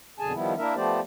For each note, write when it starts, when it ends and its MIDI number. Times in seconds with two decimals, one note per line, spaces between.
0.19 0.33 41
0.19 0.33 47
0.19 0.33 50
0.19 0.33 68
0.19 0.33 80
0.19 0.33 81
0.33 0.54 51
0.33 0.54 53
0.33 0.54 55
0.33 0.54 59
0.33 0.54 64
0.57 0.74 58
0.57 0.74 62
0.57 0.74 64
0.57 0.74 70
0.57 0.74 76
0.75 1.00 53
0.75 1.00 57
0.75 1.00 59
0.75 1.00 67
0.75 1.00 72
0.75 1.00 74